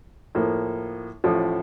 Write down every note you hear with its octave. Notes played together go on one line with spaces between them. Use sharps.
A2 F3 A#3
A1 A2 F3